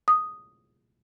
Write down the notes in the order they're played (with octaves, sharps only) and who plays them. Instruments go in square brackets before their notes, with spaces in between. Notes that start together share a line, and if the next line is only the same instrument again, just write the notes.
[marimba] D#6